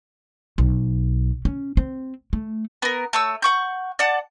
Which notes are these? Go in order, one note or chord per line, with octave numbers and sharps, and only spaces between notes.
B1
C#4
C4
A3
B3 A#4
A3 C#5 E6
F#5 C#6 G6
D5 F#5 A5